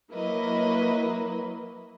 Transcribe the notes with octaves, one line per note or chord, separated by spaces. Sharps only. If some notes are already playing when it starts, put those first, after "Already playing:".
F#3 A#3 E4 A#4 B4 D#5